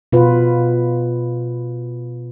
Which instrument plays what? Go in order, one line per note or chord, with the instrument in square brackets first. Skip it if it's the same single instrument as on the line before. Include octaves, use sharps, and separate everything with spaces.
[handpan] B2 F4 B4